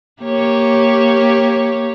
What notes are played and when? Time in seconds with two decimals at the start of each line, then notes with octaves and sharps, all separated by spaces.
0.22 A#3 G4 C#5